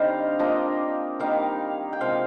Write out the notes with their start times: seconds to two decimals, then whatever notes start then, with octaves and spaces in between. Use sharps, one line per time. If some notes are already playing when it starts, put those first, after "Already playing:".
Already playing: D3 G3 C4 D#4 D#5 F5 G5
0.39 F3 A#3 D4 D#5
1.20 D#3 G3 A#3 D#4 F5
1.93 G5
2.00 C3 F3 G#3 F5